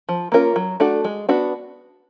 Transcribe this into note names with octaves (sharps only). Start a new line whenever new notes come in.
F3
A#3 C#4 F4 A#4
F#3
A3 D4 F#4 A4
G#3
B3 D4 F#4